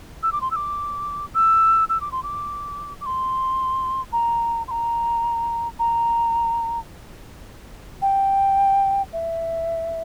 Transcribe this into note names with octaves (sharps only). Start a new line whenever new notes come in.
E6
D6
C6
E6
D6
E6
E6
D6
C6
D6
D6
C6
A#5
C6
A#5
A#5
G5
E5